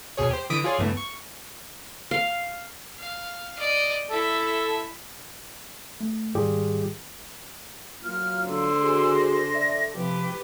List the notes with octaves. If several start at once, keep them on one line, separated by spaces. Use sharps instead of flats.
D#2 B2 G#4 C#5
G4 C5
D3 E3 D#6 B6 D7
F4 G#4 C#5 D5
C#2 G2 E3 A3 B3
C#6
F5
F5
D5 D#5
E4 A4 E5
A3
G#2 D#3 G3 F4 G4 G#4
F#3 A#3 F4 F6
D3 C5 E6
F#4 G#4
A#6
A4 D5 E5
C3 F3 G4 B4